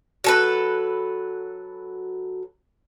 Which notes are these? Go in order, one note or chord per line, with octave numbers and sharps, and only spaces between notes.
F#3 A4 B4